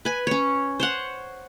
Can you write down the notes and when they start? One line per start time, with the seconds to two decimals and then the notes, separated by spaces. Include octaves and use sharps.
0.05 B4 G#5
0.27 C#4 C#5
0.80 C5 C#5 F#5